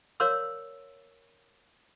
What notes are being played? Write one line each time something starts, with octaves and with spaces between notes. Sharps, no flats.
A#4 C#5 D5 F5 C6 E6